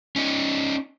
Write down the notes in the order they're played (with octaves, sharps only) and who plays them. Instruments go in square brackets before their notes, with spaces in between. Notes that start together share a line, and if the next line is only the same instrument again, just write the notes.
[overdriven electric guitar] C#4 D#4